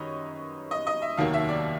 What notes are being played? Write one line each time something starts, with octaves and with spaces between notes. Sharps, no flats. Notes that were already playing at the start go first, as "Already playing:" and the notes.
Already playing: F#2 D#3 G3 B4 C#5 D#5
D#5
D#5
E5
F1 D#2 D#3 F#3 A#3 F5
E5
D5